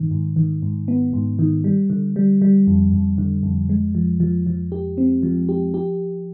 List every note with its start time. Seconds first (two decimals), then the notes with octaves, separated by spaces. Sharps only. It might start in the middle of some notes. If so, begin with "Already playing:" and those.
Already playing: G#2 D#3
0.11 G#2
0.36 D#3
0.62 G#2
0.88 B3
1.13 G#2
1.39 D#3
1.64 G3
1.90 D3
2.16 G3
2.42 G3
2.67 F2
2.92 F2
3.18 D3
3.43 F2
3.69 G#3
3.95 F3
4.20 F3
4.47 F3
4.72 G4
4.98 C4
5.23 F3
5.49 G4
5.74 G4